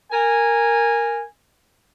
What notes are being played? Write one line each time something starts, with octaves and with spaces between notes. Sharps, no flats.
A#4 G#5